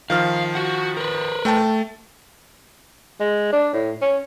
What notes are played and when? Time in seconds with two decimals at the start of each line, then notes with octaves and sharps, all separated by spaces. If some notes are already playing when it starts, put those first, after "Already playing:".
0.10 D#3 F3 F5 F6
0.55 F#4 F#5
0.97 A#4 B4
1.45 A3 G5 A5
3.20 G#3
3.52 D4
3.73 A2
4.01 C#4